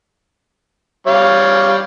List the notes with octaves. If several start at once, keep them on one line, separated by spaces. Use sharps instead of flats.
G3 C#5 F5